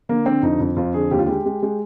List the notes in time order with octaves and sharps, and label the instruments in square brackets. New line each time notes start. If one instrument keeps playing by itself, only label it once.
[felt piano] D3 [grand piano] A#3
[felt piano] D3 [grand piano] C4
[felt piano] F2 [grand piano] D#4
[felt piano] F2
[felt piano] F2 [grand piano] F4
[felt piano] D3 [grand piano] G#4
[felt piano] D#2 [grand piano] G4
[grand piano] F4
[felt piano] G#3 [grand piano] G4
[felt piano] G#3
[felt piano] G#3 [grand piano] G4